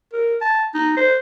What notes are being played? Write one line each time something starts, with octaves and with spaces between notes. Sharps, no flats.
A#4
A5
D#4
C5